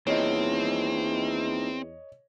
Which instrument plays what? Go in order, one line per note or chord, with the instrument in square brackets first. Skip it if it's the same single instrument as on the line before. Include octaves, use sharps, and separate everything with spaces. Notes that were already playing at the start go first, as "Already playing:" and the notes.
[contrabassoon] E2 [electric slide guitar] A#3 D#4 F4 [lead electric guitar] C4 [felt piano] C#5 D#5